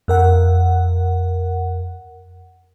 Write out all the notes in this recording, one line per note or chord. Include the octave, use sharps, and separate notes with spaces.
F2 A#4 F#5